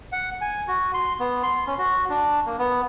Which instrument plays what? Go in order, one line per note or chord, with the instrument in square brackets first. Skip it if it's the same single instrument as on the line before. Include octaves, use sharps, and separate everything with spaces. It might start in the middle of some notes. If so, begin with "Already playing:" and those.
[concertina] F#5
G#5
F#4
C6
B3
C6
C#4
F#4
D4
A#3
B3